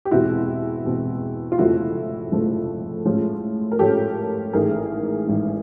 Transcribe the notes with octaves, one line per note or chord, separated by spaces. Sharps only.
G4
E2 B2 G#3 C4 E4 F#4
E2 B2 G#3 C4
F4
F1 F2 C#3 F3 A3 E4 F#4
F1 F2 C#3 F3 A3
A2 F3 G#3 C#4
A#4
A2 F3 G#3 C#4 G4 A4
A1 G#2 D#3 G#4 A#4
A1 G#2 D#3